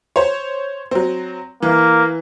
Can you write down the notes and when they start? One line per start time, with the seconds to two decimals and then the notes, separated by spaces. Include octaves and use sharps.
0.16 C5 C#5
0.91 F#3 C4
1.62 E3 A#3